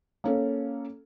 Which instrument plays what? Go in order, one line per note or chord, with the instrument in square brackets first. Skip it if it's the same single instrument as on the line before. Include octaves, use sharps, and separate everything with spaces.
[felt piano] A#3 C#4 A4